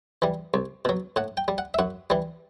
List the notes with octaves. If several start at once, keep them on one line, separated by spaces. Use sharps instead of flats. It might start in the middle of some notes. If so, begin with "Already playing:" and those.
E3 G3
C2
B2 F#3
A2 F#5
G5
G3
F#5
E5
F#2 F#5
E3 G3